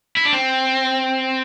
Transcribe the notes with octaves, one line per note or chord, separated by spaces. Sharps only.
E4
D4
C4